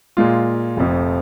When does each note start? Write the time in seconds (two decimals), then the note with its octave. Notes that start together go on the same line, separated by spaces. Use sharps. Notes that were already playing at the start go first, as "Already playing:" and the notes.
0.17 A#2 G#3 F4
0.77 F1 F2 F3